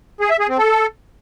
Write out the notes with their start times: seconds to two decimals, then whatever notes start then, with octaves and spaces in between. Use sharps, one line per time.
0.21 G#4
0.30 E5
0.39 G#4
0.49 C4
0.58 A4